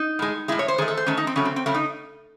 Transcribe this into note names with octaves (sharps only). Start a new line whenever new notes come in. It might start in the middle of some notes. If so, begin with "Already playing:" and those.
Already playing: D#4
A2 G#3
A2 G#3 E4
C#5
C5
D#3 A3 G#4
A4
C5
D#3 A3 C#4
D#4
C4
C#3 F#3 A3 C#4
C4
C4
C#3 F#3 A3 C#4
D#4